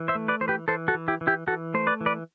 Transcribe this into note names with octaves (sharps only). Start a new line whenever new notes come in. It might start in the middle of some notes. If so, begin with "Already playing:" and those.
Already playing: E3
C5 E5
A3
B4 D5
E3 C5
G4 B4
E3 A4 C5
F#4 A4
E3
E4 G4
E3
E4 G4
E3 F#4 A4
A3 C5
B4 D5
E3
B4 D5